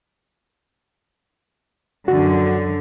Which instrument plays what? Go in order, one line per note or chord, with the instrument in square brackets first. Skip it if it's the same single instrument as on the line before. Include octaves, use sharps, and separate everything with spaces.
[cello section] F#2 D3 [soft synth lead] F#4